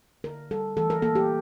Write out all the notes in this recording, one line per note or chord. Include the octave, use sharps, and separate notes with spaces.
D3 A#4
G3 A4
E3 A4
A#4
A#3 A4
G4